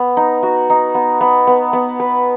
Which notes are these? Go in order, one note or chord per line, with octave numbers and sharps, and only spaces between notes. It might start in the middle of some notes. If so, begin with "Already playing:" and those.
Already playing: B3
D#4
F#4
D#4
B3
B3
B3
B3
B4